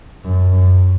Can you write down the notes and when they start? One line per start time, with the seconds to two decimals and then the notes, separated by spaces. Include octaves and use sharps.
0.25 F#2
0.53 F#2